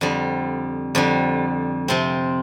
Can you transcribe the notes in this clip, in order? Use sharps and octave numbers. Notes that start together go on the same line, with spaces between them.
F2 D3 G3
F2 D3 G3
C3 F3 C4